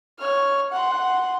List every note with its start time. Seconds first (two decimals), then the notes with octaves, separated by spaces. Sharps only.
0.19 C#5 F6
0.72 F#5 C6